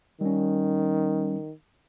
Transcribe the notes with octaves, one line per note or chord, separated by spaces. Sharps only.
D#3 G3 C#4